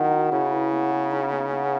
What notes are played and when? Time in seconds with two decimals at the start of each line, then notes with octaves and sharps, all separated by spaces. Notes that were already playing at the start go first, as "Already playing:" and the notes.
Already playing: D#3 F#3 B3 E4 G#4
0.12 F#4
0.32 C#3 E4
0.52 B4
0.72 B3
0.91 G#4
1.11 D#4
1.31 B3
1.51 B3